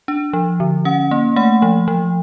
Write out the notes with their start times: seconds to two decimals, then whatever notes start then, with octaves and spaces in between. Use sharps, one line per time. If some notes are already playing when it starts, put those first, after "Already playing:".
0.08 D4
0.33 F3
0.60 D3
0.85 C#4 F#5
1.11 A#3
1.36 A3 F#5
1.62 F3
1.88 F3